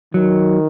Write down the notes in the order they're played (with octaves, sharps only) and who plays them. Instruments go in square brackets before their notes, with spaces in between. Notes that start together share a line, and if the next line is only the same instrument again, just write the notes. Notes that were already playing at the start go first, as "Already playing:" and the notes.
[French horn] D#3 [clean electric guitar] F#3